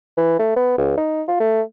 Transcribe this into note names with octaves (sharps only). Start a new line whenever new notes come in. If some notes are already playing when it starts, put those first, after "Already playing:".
E3
A3
B3
C#2
D#4
F4
A3